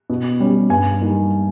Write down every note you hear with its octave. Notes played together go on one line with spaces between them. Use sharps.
B2
G3 C#4
G2 G#5
G3 A#3 D#4